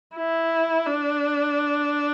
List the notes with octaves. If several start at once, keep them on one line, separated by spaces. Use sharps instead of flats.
E4
D4